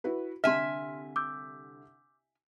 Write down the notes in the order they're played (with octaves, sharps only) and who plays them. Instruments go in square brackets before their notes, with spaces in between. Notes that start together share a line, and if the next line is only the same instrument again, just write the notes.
[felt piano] E4 F#4 B4
[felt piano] C2 D3 [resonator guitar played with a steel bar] E5 G#5 [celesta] C6 F6
[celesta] D6 E6 G6